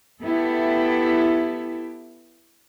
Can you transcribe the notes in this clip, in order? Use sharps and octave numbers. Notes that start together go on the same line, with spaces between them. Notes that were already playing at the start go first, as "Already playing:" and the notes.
B3 E4 G4 A4